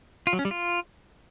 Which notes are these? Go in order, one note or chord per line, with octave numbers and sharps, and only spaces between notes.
F4
F#3
C#4
G3
F4